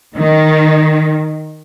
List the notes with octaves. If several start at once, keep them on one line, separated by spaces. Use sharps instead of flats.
D#3